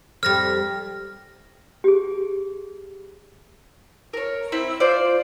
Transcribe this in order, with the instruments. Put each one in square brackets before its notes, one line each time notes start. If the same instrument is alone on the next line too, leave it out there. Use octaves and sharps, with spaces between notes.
[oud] F2 G3 [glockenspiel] F6 A#6
[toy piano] G4 G#4
[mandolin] A#4 C#5
C4 E4 E5
F4 C5 D5